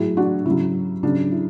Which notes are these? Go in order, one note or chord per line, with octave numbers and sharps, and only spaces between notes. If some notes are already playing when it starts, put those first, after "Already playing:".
Already playing: A2 F#3 E4 G#4
D4 F#4
C#3 F#3 E4
C#3 F#3 D4
E4